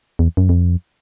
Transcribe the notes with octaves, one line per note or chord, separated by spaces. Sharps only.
E2
F#2
F2